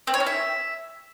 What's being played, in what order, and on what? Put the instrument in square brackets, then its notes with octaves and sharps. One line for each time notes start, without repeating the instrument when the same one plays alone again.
[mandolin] C4
C#5
C#4
E5